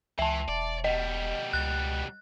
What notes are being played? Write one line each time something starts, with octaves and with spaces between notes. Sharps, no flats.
C#2 E3 E5 A5
E1 D5
B2 G3 D#5
C#2 F#6